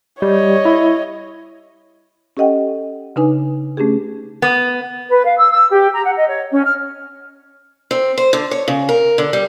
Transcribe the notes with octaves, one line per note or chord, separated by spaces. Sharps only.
G3 C#5 D#5
E4
C#4 G4 A4 D#5 F#5 G5
C#3 D4 D#4 B4 G#5
A3 C#4 D4 G4 G#4
B3
B4
F5
E6
E6
G4
A#5
F#5
D#5
C#5
C#4
F6
C4
C5
D3
C#5
C#3
A#4
D3
G3